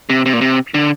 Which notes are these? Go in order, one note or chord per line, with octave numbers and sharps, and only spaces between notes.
C3
C3
A#2
C3
D3